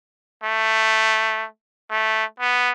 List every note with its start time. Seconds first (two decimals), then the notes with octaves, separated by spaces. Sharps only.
0.44 A3
1.90 A3
2.40 B3